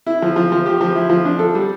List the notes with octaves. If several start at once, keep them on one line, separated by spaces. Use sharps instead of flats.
E4
F3
F3
F3
G4
F3
E4
F3
D4
A4
G3